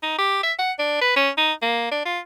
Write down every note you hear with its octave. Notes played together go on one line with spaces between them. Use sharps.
D#4
G4
E5
F#5
D4
B4
C#4
D#4
A#3
D4
F4